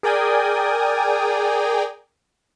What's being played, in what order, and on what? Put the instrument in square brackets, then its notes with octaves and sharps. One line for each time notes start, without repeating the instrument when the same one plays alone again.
[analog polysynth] G#4 A#4 D5 G5 G#5 D#6